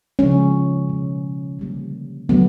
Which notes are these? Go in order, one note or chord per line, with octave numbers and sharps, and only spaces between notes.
C#3 F3 G#3 C#4
B2 G#3
D3 G3 A#3
D3 F#3 A3 B3